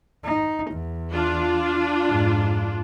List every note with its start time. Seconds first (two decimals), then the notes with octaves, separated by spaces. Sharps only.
0.25 D#4
0.71 E2
1.12 D4 F4
2.08 F2 G#2